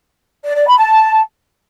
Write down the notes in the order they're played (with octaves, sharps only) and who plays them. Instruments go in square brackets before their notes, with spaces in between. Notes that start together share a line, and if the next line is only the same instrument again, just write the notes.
[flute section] D5
D5
B5
A5